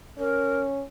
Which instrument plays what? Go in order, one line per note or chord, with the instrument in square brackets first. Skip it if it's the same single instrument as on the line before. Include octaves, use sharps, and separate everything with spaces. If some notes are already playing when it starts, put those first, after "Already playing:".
[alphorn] C#4 [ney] A#4